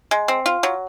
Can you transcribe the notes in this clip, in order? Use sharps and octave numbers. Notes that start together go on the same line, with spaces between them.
G#3
C4
F4
F#3